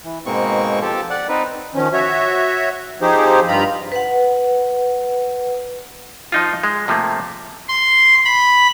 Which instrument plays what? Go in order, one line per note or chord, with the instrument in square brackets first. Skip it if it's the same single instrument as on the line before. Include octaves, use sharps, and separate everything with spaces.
[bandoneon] E3
G#2 B2 G#3 A#3 C4 C#6
F3 G4 A4
D5 F#5
C4 D#4 B4
[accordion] D#3 F3 C#4
F#4 C#5 E5
F3 C4 D#4 G4 G#4 C5
G2 F4 A#5 B5
[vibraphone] B4 F#5
[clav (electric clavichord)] F3 D#4 F4
G#3
C3 F3 A3 A#3
[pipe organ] C6
B5